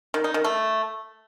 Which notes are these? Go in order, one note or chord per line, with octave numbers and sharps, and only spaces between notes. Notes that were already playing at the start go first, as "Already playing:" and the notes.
D#3
D#4
D#3
A3